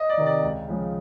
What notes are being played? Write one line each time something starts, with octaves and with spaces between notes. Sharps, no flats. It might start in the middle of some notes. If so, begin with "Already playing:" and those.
Already playing: D#5
D5
C3 D#3
D5
C#2
C#3 F3 G#3